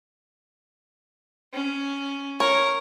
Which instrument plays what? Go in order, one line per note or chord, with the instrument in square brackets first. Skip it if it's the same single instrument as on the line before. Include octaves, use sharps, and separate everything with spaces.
[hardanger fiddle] C#4
[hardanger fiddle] A#4 [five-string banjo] C#5